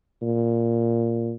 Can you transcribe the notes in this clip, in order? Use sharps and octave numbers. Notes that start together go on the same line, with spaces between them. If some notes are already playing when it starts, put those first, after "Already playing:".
A#2